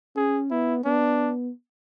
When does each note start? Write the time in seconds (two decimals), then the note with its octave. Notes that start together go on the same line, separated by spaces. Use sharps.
0.16 C#4 G#4
0.51 B3 E4
0.85 B3 D4